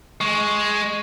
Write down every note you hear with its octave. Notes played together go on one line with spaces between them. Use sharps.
G#3 C#6